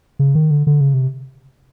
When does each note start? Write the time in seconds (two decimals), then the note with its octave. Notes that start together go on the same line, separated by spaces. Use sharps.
0.19 C#3
0.35 D#3
0.51 D3
0.67 D3
0.81 C#3
0.94 C3